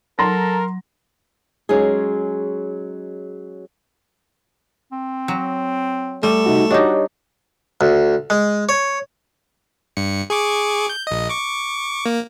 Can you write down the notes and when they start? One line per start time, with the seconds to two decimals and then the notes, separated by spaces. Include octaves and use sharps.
0.19 F#3 A4 A#4 A#5 C6 A#6
1.69 F#3 G#3 C#4 D#4 G#4
4.92 C4
5.28 F#3
6.23 G3 A3
6.46 C3 D#4 F#4
6.71 D4 D#4 F#4 G4 C#5 D#5
7.81 D2
8.30 G#3
8.69 C#5
9.97 G2 C#7
10.30 G#4 C#6 D6
10.90 G6
11.07 A#1 D#5
11.29 C#6 D6
12.06 A#3